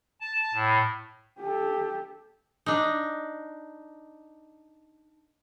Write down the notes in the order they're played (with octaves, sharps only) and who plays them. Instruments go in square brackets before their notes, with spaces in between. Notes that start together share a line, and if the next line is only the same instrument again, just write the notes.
[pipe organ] A5
A2
[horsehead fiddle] G4 A4
[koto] D4 D#4